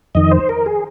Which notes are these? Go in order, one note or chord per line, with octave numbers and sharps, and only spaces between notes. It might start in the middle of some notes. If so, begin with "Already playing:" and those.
F2 D#3 D#5
C5
A#4
G#4